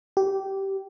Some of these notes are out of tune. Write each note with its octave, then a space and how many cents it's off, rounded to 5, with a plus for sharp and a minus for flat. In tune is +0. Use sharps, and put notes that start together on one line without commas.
G4 -15